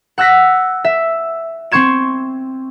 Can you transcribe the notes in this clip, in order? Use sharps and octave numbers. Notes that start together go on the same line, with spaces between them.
F#5 E6 F#6 A#6 B6
E5
C4 C6 C#6 G#6 E7